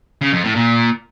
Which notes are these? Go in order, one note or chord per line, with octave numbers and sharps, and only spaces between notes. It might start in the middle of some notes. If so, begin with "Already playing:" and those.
C#3
F2
A2
A#2